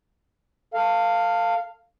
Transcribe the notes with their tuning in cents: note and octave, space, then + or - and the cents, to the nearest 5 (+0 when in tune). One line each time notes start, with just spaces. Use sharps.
A4 +30 F5 +0